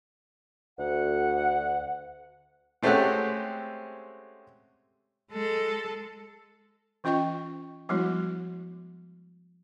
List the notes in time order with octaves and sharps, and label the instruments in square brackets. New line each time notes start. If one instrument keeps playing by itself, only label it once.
[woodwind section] D2 F#5
[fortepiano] G#3 A3 C4 C#4 G4 F#5
[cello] G#3 A4
[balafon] E3 C#4 F4 D#5 G5 C#6
F3 G3 G#3 B3 E4 F#4